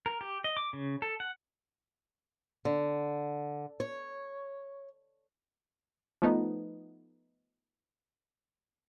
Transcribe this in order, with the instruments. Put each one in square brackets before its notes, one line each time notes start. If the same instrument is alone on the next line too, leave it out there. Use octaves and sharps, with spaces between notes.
[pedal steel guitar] A#4
G4
D#5
D6
C#3
A4
F#5
[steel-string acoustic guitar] D3
C#5
[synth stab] F3 A3 B3 D#4